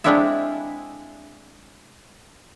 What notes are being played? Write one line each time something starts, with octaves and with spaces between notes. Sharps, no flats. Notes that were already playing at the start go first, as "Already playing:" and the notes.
G#3 C4 D4 E4 F4 E5